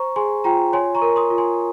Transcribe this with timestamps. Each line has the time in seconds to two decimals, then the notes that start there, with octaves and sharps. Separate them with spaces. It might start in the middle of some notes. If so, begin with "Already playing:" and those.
Already playing: C5 A#5 C#6
0.16 G#4 G#5 C6
0.44 F4 G5 A#5
0.73 C#5 G#5 C6
0.95 A#5 C#6
1.02 A#4
1.16 C6 D#6
1.30 F4
1.38 G#5 C6